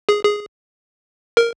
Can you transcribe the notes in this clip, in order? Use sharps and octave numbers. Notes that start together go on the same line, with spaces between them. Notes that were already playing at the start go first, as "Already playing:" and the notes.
G#4
G#4
A#4